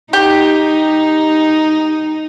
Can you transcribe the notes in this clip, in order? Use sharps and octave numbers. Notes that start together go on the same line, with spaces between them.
D#4 G4